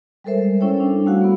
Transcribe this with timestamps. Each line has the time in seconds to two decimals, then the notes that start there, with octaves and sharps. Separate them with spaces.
0.24 G3 G#3 A4 A#4 C5 E5
0.60 C#4 E4 A4 C#5 G5
0.78 G3 D4
1.06 G3 A3 E4 F#4 F5 F#5
1.21 A#3 B3